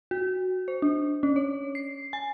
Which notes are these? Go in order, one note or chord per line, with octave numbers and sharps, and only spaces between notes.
F#4
C5
D4
C#4
C#5
C7
G#5